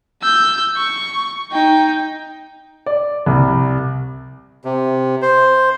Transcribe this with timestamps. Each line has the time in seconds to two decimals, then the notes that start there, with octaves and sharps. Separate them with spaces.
0.22 E6 G6
0.76 C#6
1.52 D#4 G5
2.86 D5
3.26 C2
4.65 C3
5.22 C5